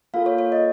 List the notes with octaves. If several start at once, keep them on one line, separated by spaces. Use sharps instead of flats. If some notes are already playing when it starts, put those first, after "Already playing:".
A#3 F4 A4 F5
C#5
C#5
D#5